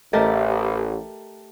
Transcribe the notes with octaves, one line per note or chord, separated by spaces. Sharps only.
A1 A3 G4 A#4 D#5 A5 A#5